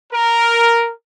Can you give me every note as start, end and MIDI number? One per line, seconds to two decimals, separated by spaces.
0.12 0.91 70